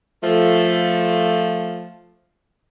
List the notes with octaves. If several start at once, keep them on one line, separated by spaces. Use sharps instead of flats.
F3 A3